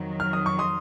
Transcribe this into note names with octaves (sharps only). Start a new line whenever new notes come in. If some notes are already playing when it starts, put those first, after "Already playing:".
Already playing: F2 D#3 F#3
F6
D#6
C#6
C6 D#6